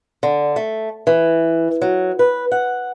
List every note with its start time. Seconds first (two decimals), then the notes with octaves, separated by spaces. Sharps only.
0.23 D3
0.56 A3
1.07 E3
1.82 F#3
2.19 B4
2.52 F#5